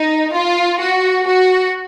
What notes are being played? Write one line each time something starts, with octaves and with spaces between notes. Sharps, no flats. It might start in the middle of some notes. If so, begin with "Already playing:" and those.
Already playing: D#4
F4
F#4
F#4